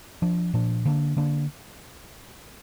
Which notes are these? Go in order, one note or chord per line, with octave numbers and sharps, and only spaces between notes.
F3 D4
A#2 F3 D4
D3 A#3 D4
D3 A#3 D4